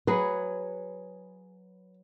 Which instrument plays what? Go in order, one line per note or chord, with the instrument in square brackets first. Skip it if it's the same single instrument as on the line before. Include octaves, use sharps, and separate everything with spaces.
[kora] F#3 G#4 [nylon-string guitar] B4